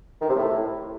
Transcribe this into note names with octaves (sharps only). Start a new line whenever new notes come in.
D#3
C3
A2